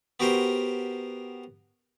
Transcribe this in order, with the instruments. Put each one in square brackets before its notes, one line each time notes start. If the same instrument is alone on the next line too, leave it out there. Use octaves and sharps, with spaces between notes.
[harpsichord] B3 F#4 G4 A#4 C5 A#5